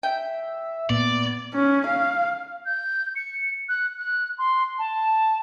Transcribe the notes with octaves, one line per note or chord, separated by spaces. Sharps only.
E5 G5
A#2 B3 D5
C#4
F5
G6
C#7
F#6
F#6
C6
A5